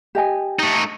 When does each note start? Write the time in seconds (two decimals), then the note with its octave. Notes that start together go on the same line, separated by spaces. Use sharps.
0.15 G4 D#5 G#5
0.59 A3 D#4